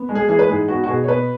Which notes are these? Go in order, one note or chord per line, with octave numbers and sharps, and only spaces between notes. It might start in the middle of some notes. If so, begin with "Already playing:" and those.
Already playing: B3
G#3
G#4
E3 G#4
B4
G#2 G#4
B3 F#4
F#4
B2 G#4
C#5
B3 B4